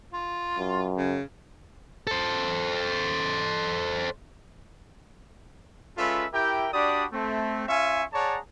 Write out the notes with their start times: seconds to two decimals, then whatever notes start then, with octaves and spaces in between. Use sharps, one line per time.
0.14 F4
0.58 F#2
0.98 C#3
2.07 A4 C5
5.98 G#3 C#4 F4 A4 B4 E5
6.33 E4 G4 A#4 E5 G5
6.73 D4 F#4 G4 D5 B5 D#6
7.12 A3 C4
7.68 C#4 F4 E5 F5 G#5 C#6
8.13 G#4 C#5 D5 F#5 A5 A#5